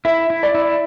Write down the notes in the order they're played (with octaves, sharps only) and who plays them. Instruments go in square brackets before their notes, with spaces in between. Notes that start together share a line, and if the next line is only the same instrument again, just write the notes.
[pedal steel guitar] E4 [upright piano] E5
[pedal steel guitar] E4
[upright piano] D5
[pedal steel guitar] E4